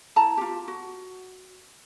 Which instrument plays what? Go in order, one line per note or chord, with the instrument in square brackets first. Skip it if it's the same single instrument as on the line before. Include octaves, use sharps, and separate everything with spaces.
[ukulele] E4 A5 A#5
F4 G4
F#4